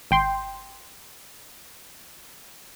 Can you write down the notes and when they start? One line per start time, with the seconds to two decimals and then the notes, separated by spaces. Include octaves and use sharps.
0.11 G#1 G5 C6